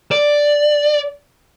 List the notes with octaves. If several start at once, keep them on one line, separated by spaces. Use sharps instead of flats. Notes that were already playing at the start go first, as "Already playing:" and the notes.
D5